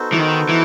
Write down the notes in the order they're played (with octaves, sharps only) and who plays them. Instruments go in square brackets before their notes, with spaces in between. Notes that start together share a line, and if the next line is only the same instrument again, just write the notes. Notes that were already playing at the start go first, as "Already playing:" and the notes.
Already playing: [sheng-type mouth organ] B3 D#4 F#4 A4 C5
[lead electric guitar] E3
D#3
E3